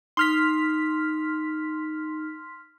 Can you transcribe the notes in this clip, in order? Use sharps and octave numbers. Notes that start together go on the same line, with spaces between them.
D#4 C6 F6 B6